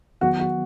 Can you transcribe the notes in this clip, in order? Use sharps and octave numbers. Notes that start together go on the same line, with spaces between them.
D#3 F#3 B3 F#4
F#4